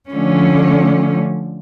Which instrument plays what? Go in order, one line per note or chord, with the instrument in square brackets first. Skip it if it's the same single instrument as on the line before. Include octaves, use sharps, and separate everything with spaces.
[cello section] D3 F3 A3 C#4